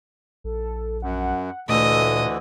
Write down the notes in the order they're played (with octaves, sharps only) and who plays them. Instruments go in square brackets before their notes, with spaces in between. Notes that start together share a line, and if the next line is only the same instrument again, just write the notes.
[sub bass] A#1 [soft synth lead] A4
[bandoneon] F#2 [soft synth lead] F#5
[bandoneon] D2 D3 E3 [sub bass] A#2 [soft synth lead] A3 [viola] D#5